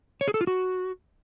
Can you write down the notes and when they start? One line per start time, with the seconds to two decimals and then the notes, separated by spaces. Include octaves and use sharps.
0.21 C#5
0.28 G#4
0.34 A4
0.41 F4
0.47 F#4